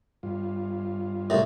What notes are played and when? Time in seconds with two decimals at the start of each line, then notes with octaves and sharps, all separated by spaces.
0.23 G2 F4
1.30 C2 A2 E5